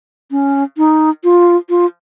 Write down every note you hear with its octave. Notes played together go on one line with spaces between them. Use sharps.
C#4
D#4
F4
F4